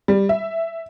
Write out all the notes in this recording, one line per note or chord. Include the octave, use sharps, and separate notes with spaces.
G3
E5